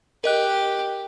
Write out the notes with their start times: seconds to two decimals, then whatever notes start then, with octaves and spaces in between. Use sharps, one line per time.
0.24 G4 A#4 D#5 F#6